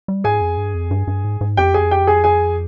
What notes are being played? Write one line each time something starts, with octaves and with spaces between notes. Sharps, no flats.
G3
G#2 G#4 G#5
F2
G2
F2
G2
G2
G#2
G#2
F2 G4 G5
G#4 G#5
G4 G5
G#4 G#5
G#4 G#5